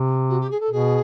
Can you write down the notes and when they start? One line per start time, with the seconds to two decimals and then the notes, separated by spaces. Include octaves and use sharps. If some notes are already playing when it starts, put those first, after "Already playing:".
Already playing: C3
0.29 F#4
0.40 G4
0.51 G#4
0.60 A4
0.71 B2 G#4